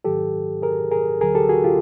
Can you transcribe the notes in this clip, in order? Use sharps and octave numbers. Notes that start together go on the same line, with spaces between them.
G#2 D#3 F#3 G4 A4
G#4 A#4
G#4 A#4
D2 D3 F#3 G#4 A#4
G4 A4
F#4 G#4
F4 G4